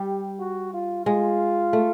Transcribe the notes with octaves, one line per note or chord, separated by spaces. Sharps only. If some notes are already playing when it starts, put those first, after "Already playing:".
Already playing: G3 G4
F#4
F4
G#3 F4
A3